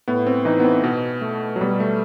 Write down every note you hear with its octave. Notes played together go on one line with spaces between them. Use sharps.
A2 B3
C4
E3 D#4
B3
C4
B2
A3
F#3
B2 G3
A3